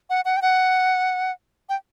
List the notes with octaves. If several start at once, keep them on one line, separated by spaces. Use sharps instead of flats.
F#5
F#5
G5
F#5
G5